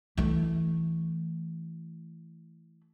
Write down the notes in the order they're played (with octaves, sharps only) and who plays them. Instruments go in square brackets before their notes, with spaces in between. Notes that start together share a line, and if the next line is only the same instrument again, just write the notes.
[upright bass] E3 A3